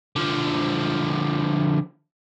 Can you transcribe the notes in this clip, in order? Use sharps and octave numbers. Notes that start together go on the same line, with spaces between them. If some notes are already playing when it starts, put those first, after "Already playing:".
D3 F3